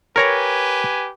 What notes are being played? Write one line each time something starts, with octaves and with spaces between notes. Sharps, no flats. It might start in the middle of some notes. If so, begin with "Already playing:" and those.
G4 A#4 B4 C#5 G#5 A#5